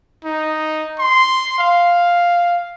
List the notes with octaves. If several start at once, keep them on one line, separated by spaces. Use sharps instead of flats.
D#4
C6
F5